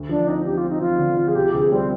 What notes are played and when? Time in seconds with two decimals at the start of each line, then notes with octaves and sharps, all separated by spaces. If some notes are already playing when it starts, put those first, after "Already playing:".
Already playing: D2
0.09 F3 D4
0.28 C4 D#4
0.45 F3 G4
0.57 F4
0.63 C4
0.69 D#4
0.81 F3 F4
0.99 D3
1.17 F3
1.28 G#4
1.35 C3 G4
1.54 D2 G#4
1.72 G3 C4